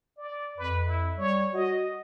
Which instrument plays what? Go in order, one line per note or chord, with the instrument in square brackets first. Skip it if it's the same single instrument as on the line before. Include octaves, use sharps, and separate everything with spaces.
[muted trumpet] D5
[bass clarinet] F2 [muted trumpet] B4
[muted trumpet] E4
[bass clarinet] G3 [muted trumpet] C#5
[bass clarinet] F#4 [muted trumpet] D#5